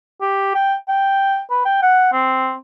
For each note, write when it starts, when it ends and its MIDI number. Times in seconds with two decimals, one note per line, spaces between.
0.21 0.50 67
0.55 0.75 79
0.89 1.40 79
1.50 1.61 71
1.65 1.82 79
1.82 2.10 78
2.13 2.56 60